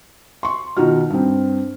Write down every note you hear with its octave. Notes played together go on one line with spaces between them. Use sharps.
C6 C#6
B2 D#3 D#4 F4 F#4 F6
G2 C4